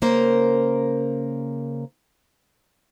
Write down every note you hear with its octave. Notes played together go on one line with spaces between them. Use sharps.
C#3 A#3 A#4 C5